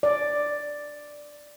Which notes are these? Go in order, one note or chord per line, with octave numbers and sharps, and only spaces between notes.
D5